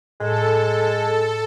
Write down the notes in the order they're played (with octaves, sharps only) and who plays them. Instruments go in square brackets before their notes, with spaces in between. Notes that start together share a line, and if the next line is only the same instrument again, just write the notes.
[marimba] A2 [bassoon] G#3 [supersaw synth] A4